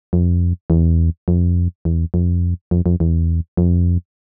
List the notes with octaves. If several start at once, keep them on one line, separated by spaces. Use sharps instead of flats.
F2
E2
F2
E2
F2
F2
F2
E2
F2